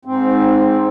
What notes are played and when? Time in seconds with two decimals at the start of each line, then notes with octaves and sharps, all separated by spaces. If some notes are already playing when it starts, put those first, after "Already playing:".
0.05 G#2 C4